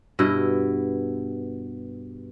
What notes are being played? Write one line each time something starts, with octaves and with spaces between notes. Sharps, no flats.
G2 B2 E4 D#5